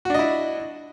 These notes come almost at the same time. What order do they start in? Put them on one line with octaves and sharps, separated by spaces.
F#4 D4 D#5 E4